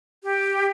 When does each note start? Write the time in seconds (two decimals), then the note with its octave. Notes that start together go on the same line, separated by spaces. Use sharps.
0.23 G4